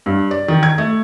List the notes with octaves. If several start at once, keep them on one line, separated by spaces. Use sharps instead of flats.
G2
D5
D#3
G#6
A3